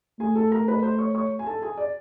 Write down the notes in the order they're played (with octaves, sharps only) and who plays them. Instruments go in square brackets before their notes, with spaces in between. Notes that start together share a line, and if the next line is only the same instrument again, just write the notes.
[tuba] A3 [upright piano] G#4 G#5
[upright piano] A4 A5
A#4 A#5
B4 B5
C5 C6
C#5 C#6
C#5 C#6
G#5
A4 A5
G#4 G#5
D5